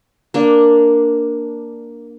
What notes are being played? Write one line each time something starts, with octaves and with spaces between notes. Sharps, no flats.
A#3 D4